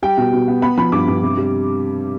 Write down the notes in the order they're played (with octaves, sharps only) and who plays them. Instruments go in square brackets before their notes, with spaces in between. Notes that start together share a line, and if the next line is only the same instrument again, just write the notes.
[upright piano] G3 G5
B2
B2
B3
B3 B5
F3 B5
G2 D6
G2
C3
G3